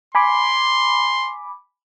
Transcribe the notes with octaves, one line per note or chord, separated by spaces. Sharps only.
G#5 B5 C6 D6